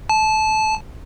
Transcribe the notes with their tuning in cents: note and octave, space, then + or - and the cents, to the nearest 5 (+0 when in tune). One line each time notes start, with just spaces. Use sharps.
A5 -20